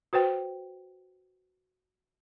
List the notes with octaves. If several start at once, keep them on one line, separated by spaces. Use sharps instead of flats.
F#4 B4 C5 G5